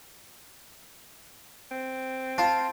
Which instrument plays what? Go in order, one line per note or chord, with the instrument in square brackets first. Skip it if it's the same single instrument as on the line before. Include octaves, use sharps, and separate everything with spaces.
[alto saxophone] C4
[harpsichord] F4 [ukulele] A5